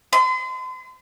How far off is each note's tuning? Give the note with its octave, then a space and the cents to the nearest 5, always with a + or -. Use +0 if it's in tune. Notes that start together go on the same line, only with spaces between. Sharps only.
C6 -40